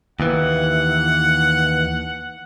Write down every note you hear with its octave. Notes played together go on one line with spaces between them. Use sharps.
D#2 E3 F#5